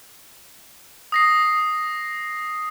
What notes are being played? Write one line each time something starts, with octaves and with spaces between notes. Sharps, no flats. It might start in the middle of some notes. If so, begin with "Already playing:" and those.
D#6 A#6 C7